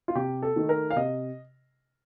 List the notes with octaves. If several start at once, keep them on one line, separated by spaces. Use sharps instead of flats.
F4
C3 G4
A4
D#3 A3
A#4
F5
C3 D#5